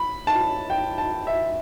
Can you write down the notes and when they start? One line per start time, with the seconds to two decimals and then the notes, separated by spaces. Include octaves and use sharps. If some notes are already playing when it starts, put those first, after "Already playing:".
Already playing: B5
0.27 A5
0.70 G5
0.98 A5
1.27 E5